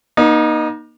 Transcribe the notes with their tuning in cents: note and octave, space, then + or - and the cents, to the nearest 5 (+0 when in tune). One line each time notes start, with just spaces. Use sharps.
A#3 +40 D#4 -10